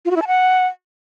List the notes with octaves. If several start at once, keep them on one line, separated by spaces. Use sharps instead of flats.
F4
F#4
E4
A5
F#5